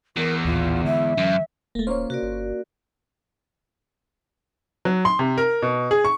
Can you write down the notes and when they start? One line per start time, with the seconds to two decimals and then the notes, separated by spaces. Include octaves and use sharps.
0.16 E2 A#4
0.45 A1 D#2 A#2 F4
0.84 D3 E3 G#3 E5
1.18 F#2
1.75 D#1 A3 A#3
1.87 A#3 C#4 F4 C5 C#5
2.10 C3 F#4 A#4 D5
2.22 G1
4.85 F#3
5.05 C6
5.19 C3
5.38 A#4
5.62 B2
5.91 G#4
6.05 C#6